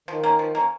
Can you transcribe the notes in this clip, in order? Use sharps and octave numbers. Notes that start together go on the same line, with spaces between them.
D#3 F3
A#3 C#4
F3
A#3 C#4